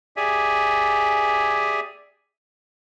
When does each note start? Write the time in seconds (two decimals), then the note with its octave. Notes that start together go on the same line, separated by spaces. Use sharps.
0.17 G4 G#4 D5 E5 G#5